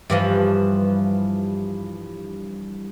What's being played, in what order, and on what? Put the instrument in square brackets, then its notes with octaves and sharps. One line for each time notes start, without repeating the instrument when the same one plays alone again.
[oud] G2 E3 F3